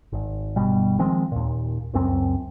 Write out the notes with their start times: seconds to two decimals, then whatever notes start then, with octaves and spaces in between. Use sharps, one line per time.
0.12 G#1
0.56 G1 B2 G3
0.99 D#3 F3 G#3 C4
1.32 D#2 A#2
1.93 C#2 F#2 C4